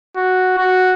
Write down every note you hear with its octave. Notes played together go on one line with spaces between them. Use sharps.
F#4
F#4